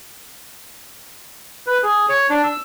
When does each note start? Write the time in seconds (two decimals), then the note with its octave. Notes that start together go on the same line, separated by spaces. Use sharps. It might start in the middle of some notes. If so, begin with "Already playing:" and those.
1.67 B4
1.83 G#4
2.09 C#5
2.30 D4
2.44 E6